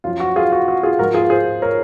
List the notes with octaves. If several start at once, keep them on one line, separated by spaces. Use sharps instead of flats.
F#2 F3 F4
F#4
F4 G#4
F#4
F#4
F4 G#4
G#2 F3 F#4 A#4
F4 G#4
G#4 C5
A#4 C#5